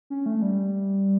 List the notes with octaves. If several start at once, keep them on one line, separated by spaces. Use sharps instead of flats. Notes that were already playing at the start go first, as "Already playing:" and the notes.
C#4
A3
G3